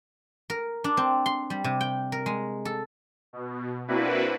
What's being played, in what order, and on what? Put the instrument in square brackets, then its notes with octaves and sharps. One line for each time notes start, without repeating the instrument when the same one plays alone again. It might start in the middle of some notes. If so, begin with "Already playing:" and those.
[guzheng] A#4
D4
C4
C6
G3
C3
G5
A#4
G#3
A4
[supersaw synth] B2
A#3 C4 D4 E4 F#4 B4